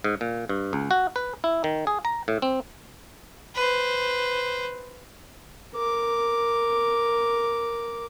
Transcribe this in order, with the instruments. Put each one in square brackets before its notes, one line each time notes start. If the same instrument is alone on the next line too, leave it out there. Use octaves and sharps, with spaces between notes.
[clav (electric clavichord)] G#2
A#2
G2
C#2
F#4
B4
E4
D#3
G#4
A#5
A2
C4
[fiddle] B4 C5
[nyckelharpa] A#4 D6